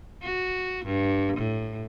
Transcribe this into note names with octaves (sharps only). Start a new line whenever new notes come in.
F#4
G2
A2